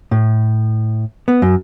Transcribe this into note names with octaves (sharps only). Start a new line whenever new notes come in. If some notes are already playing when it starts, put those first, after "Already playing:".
A2
B3
F#2